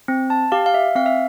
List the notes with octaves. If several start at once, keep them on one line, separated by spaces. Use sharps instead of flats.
C4
A5
G4 F5
F5
E5
C4 F5
E5